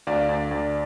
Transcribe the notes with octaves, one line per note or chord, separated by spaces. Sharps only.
D2 D5 F5
D2
D2